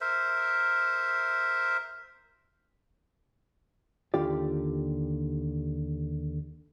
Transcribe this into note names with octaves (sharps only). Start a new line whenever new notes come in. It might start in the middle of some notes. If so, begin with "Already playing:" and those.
A#4 C5 E5
D#2 D3 D#3 F4 G4 D5